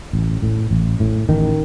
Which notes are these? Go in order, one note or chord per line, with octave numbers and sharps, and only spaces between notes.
A1
A2
A1
A2
A1 D#3